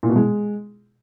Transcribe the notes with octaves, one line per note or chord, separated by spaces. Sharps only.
A#2
B2
G#3